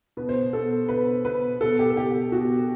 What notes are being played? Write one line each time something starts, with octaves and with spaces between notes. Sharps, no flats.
B2 B4
C5
B2 A4
B2 B4
B2 B4
B2 A4
G4
A4
B2 G4
B2 F#4